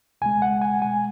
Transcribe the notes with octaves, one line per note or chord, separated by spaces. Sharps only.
C#2 B2 G#3 G#5
F#5
G#5
C#2 B2 G#3 G#5